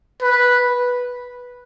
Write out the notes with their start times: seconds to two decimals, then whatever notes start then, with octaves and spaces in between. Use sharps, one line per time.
0.22 B4